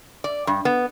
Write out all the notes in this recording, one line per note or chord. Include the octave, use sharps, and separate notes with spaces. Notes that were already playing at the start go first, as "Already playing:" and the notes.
D5
G2
B3